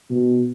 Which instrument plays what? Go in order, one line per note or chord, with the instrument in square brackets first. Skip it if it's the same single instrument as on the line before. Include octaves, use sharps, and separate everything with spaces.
[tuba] B2